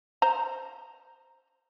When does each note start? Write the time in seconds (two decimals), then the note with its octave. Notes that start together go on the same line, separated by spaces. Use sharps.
0.22 C5 A#5